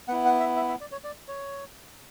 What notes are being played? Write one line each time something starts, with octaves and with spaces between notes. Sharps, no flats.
B3 E4 F#5
F#5
E5
E5
E5
D5
C#5
D5
C#5